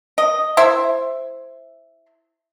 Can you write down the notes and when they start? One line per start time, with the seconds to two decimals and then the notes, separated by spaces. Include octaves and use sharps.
0.18 D#5
0.57 E4 C5 E5